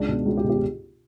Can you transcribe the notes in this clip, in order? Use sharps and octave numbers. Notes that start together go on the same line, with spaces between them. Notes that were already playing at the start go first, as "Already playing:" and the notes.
Already playing: C#2 D4
B2
C#2 F#4
G4
B2
G4